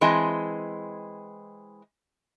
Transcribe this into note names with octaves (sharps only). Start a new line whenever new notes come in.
E3 G#3 C4 D#5 G#5 A5